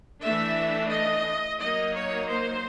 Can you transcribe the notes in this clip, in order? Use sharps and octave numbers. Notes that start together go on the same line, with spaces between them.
E3 A3 D4 E5
D#5
F#3 A#3 D#4 D#5
C#5
C5